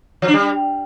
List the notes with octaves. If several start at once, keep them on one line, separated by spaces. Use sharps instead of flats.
F3
D4
G3